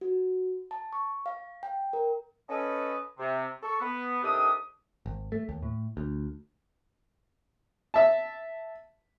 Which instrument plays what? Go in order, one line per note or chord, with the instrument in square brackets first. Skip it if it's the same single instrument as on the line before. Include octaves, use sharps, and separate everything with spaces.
[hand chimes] F#4
A5
C#6
F5
G5
A#4
[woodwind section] C#4 A4 B4 D#5
C3
A4 C#6
B3
C3 D#3 D4 G4 A4 D#6
[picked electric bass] G#1
A3
D#2
A2
D2
[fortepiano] E5 A5